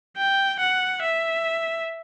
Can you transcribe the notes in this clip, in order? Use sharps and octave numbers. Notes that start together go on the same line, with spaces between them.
G5
F#5
E5